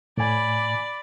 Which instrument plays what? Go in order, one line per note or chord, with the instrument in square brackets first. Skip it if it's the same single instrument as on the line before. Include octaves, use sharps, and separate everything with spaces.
[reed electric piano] A2 G#5 [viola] D5 B5